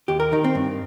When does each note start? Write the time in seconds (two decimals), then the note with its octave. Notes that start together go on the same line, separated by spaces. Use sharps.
0.08 D#2 G4
0.20 A#4
0.32 D#3 D#4
0.44 C4
0.55 G2